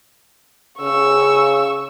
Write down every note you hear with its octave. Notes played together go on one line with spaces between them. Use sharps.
C#3 C#6 E6